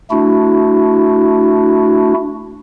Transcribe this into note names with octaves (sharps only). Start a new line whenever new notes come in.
A3 D4 E4 F#4